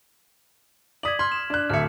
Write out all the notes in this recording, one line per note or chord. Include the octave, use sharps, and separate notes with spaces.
D5 D#6 G#6 B6 F#7
C6 F6 G#6
E7
D4 F#6
D1 E5 F6 C#7